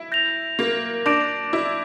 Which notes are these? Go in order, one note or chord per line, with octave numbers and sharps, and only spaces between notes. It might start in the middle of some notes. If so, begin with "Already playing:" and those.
Already playing: E4
G6 A#6 F7
A#3
D4 D6 G6 A#6 D7
E4